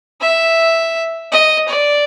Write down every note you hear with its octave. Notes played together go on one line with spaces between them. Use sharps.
E5
D#5
D5